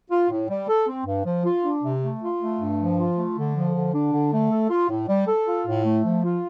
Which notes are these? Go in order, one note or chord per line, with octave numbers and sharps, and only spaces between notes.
F4
A2
G3
A4
C4
G2
F3
F4
D4
C3
A3
F4
A3
G2
F3
F4
A3
D3
F3
D3
D4
D3
A3
A4
F4
A2
G3
A4
F4
A2
A3
F3
F4